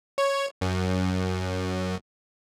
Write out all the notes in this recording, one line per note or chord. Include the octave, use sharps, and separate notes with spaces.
C#5
F#2